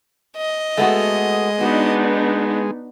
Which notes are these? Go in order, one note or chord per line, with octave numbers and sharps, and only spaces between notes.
D#5
G#3 A3 B3 F#4
B3 D4 D#4 F#4